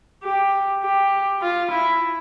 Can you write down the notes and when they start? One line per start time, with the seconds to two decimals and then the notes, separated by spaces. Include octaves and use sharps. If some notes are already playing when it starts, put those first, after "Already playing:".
0.24 G4
0.84 G4
1.42 F4
1.71 E4